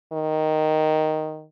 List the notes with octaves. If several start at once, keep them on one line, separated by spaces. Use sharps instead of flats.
D#3